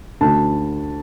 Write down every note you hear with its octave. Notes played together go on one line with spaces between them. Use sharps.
D2 A5